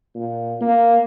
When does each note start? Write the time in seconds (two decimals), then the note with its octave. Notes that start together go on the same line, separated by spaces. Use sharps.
0.15 A#2
0.61 A#3